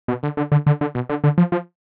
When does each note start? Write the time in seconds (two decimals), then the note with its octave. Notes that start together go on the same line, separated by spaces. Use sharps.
0.08 B2
0.23 D3
0.37 D3
0.52 D3
0.66 D3
0.81 D3
0.95 B2
1.09 D3
1.24 D3
1.38 F3
1.52 F3